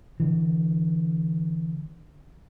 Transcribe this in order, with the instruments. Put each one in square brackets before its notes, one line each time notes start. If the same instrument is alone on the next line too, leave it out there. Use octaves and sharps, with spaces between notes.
[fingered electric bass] D3 E3